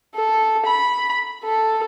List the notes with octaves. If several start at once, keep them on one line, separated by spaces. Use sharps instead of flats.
A4
B5
A4